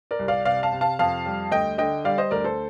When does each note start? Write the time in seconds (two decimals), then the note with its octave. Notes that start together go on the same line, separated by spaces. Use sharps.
0.11 A#4 D5
0.19 C2
0.28 D5 F5
0.45 C3 D5 F5
0.63 F5 A5
0.72 C3
0.81 F5 A5
0.99 F2 F5 A5
1.26 G3
1.51 D2 D#5 G5
1.78 D3 D#5 G5
2.04 G3 D5 F5
2.18 C5 D#5
2.31 D2 A#4 D5
2.44 A4 C5